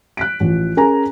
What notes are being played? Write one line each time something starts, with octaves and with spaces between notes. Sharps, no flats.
F#6 B6 D7
A1 F3
C#4 G#4 A#4 G#5 A#5